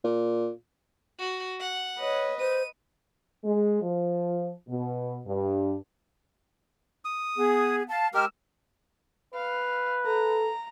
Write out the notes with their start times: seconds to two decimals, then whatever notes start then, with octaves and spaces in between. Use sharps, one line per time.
0.04 A#2
1.18 F#4
1.60 F#5
2.00 B4 C#5 D#5
2.39 C5 D#7
3.44 G#3
3.82 F3
4.68 B2
5.26 G2
7.05 D#6
7.38 B3 G#4
7.89 F5 A5
8.14 G#3 G4 A#4 E6 F6
9.35 B4 F5
10.06 A4 A#5